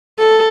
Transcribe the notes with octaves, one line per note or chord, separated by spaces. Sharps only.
A4